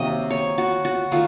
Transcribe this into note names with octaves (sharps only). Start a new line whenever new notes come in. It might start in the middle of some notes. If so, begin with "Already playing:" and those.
Already playing: C3 D#3 F#3 A#3 D#5
C#5
F#4
F#4
D#3 A3 F4